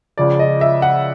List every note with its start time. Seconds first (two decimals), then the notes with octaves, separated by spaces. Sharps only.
0.18 C#2 C#3 F3 D5
0.39 D#5
0.61 E5
0.82 F#5